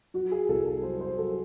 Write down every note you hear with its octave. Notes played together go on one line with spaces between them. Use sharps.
F#3 F#4
G#4
C2 A4
A4
F#3 C5
C5
F#3 A4